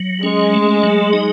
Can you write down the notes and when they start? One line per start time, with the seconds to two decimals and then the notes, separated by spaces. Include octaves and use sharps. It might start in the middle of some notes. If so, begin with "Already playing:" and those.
Already playing: F#3
0.23 G#3 C#4
0.53 A3
0.83 F#3
1.13 D#4